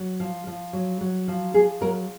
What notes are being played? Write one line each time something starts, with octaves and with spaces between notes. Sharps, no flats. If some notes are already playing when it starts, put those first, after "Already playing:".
Already playing: F#3
F3
F3
F#3
F#3
F3
F3 G#4
F#3 A#4